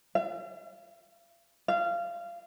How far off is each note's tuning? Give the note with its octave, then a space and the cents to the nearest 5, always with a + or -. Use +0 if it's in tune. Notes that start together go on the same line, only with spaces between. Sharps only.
F5 -45
F5 -20